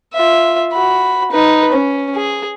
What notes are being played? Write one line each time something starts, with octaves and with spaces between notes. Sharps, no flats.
F4 E5
F#4 B5
D#4 B4
C#4
G#4